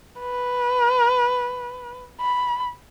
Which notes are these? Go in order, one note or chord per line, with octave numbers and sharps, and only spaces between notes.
B4
B5